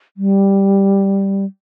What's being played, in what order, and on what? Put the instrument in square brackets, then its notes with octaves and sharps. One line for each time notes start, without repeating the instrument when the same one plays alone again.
[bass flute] G3